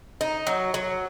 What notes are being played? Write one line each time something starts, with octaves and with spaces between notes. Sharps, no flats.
D#4
F#3
F#3